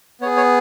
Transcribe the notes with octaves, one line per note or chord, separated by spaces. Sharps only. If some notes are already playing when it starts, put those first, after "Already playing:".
B3 G#4 C#5
C#5